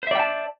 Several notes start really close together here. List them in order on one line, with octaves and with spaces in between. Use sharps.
C5 E5 D5 G5 A5